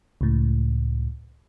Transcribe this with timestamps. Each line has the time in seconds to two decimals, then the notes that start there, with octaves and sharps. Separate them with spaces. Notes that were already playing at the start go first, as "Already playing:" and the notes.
0.21 C#2 A2